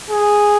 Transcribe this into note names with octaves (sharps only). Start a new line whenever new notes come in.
G#4